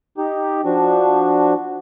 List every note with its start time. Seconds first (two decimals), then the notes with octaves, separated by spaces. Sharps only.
0.18 D#4 G4
0.65 F3 D4 F#4